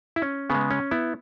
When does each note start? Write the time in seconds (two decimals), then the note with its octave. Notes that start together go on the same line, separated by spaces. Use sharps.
0.16 E4
0.22 C#4
0.50 C#3 G#3 B3
0.71 C#4
0.91 B3 E4